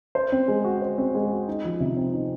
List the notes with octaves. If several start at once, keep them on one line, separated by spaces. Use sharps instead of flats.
C5
C4
G#3
F#4
C5
C4
G#3
F#4
D#4
F3
C3
C4
D#4